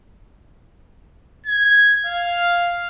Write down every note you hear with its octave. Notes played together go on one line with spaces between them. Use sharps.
G#6
F5